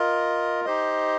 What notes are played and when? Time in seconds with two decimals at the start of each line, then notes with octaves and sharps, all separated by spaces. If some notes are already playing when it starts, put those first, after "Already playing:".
Already playing: F4 A#4 D#5
0.65 D#4 G4 C5 D#5